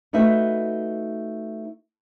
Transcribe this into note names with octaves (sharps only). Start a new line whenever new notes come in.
A3 D#4 F#4 B4 E5